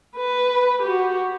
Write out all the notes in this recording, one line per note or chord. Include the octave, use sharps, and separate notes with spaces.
B4
F#4 G4